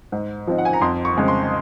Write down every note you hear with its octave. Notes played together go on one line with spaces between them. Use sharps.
G#2
F3 C4 D#4
F#5
G#5
A#5
F2 C6
C#6
C#3 G#3 C4
C6